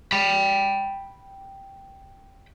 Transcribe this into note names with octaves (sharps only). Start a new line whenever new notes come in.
G5 B5